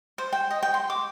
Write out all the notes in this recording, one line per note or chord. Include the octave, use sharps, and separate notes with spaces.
C5
G5
D#5
G5
C6
D6